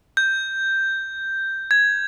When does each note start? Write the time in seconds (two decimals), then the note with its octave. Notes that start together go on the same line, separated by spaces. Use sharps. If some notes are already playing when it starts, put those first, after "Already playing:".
0.17 G6
1.71 G#6